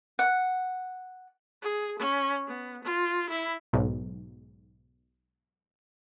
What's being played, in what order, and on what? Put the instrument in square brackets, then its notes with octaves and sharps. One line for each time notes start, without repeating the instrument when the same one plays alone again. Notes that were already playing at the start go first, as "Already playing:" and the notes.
[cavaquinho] F#5
[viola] G#4
C#4
B3
F4
E4
[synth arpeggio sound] B1 G#2